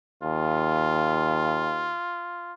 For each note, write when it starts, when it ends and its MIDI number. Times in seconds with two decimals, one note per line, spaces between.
0.23 1.96 39
0.23 2.53 65